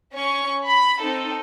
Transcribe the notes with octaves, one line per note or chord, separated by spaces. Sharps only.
C#4 C#6
B5
C4 D#4 A4